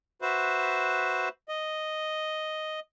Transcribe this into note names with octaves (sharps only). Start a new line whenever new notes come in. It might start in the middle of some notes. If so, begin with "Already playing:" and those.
F#4 B4 C5 E5
D#5